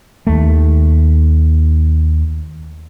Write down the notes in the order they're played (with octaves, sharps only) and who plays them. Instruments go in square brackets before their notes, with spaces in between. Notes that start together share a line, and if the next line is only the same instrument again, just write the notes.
[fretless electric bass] D#2 A3